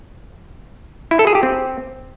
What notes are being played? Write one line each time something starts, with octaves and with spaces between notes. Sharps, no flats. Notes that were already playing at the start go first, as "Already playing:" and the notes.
E4
A4
G#4
G4
C4